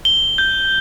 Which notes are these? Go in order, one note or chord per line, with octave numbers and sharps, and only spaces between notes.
G7
G6